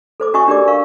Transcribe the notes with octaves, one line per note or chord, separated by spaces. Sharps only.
A4 C5 D6
C#4 F#4 D#5 G#5 C#6 D#6
D4 G4 A#4 D5 D6
A#4 F5 C#6